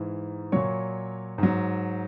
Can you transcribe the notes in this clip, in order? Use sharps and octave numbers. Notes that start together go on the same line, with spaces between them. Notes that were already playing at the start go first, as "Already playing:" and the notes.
Already playing: G#2 E3
A#2 F#3 C#5 C#6
G#2 F#3